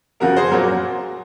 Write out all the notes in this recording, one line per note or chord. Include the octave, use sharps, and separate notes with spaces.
F2 C#3 F3 F#4 A#4
G#4 C5
A#2 F#3 A#3 F#4 A#4